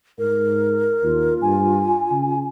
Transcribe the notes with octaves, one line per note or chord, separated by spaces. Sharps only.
G#2 A#4
D#2 F4
G2 G#5
C#3